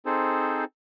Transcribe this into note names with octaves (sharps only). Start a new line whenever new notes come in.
C4 D#4 G#4 A4 C5